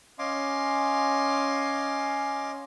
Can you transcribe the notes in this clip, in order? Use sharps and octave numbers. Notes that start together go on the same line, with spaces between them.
C#4 D#5 F5 G#5 C6 D6